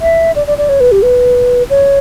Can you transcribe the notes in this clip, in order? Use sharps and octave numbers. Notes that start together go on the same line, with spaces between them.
E5
D5
D5
D5
C#5
B4
G4
B4
C#5